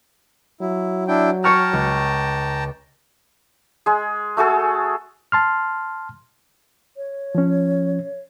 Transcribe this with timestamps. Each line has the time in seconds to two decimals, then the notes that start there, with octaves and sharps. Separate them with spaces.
0.61 F#3 E4
1.08 D4 E4 G5
1.44 C#5 G5 A5 A#5 C#6 F6
1.73 C#2
3.86 G#3 G#4
4.37 A3 F#4 G#4 A4
5.32 A5 C6 F6
6.97 C#5
7.35 F3 C#4